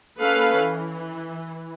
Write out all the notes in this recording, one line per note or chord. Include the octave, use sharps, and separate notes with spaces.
A#3 C#4 A4 B4 F5
E3